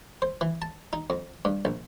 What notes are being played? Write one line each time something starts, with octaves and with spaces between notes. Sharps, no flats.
C5
E3
A5
D#4
F2
G2
A#1